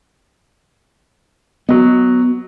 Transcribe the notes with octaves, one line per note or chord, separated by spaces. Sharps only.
F#3 B3 D#5